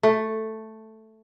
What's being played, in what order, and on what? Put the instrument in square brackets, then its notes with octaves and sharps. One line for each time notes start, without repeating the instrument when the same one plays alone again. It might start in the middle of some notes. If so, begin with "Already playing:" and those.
[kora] A3